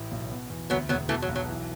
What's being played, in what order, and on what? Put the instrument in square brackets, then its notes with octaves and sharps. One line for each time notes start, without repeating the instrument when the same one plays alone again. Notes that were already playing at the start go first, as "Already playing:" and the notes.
Already playing: [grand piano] A1 A2
B1
B2
E2
[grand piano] D2 [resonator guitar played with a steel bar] F#3 B3
[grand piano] E1 [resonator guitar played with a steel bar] F#3 B3
[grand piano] B2 [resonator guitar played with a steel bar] E3 A3
[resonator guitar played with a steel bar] F#3
[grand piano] B1
[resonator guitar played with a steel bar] F#3
[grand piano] E3